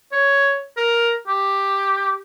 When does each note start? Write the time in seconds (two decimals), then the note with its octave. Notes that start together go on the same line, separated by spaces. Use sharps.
0.12 C#5
0.77 A#4
1.27 G4